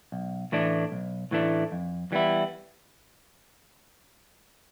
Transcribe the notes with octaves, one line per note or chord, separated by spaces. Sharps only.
B1
A2 E3 A3 D4
B1
A2 E3 A3 D4
F2
E3 G3 B3 E4